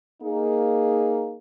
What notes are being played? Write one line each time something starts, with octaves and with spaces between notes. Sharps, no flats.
A#3 D#4 G#4